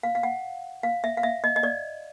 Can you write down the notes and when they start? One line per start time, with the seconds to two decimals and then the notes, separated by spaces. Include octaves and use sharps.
0.03 F5
0.15 F5
0.23 F#5
0.83 F5
1.04 E5
1.17 F5
1.23 E5
1.44 D#5
1.56 D#5
1.63 D5